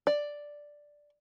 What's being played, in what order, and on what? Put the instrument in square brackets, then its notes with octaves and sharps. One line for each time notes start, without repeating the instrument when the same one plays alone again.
[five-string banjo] D5